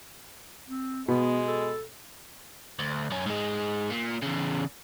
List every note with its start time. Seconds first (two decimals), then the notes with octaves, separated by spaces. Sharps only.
0.67 C4
1.08 B2 G#3 B3
1.47 A4
2.79 D2
3.11 F#2 C#4
3.26 G#2 G#3
3.91 A#2
4.23 E2 C#3